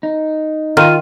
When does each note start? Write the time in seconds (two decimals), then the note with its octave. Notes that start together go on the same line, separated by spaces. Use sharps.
0.03 D#4
0.77 D#3 F4 F6 D#7